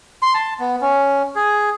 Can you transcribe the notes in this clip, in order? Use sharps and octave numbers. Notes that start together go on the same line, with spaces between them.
C6
A5
B3
C#4
G#4